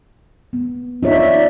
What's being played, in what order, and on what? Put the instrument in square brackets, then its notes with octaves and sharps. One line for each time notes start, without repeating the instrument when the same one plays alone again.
[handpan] B3
[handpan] D#4 F4 C#5 [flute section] D5 E5